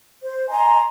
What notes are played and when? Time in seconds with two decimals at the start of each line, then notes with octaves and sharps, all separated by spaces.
0.22 C5
0.49 D#5 G#5 A#5 C6